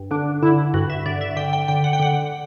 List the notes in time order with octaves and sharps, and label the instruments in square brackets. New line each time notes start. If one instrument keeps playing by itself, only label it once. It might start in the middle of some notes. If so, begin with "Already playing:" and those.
Already playing: [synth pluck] G2
D3 D4
D3 E4
G2 F#4
E5
D3 D5
E5
D3 G5
G5
D3 G5
F#5
G5
D3 F#5